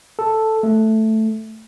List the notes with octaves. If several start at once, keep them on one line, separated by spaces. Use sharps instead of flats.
A4
A3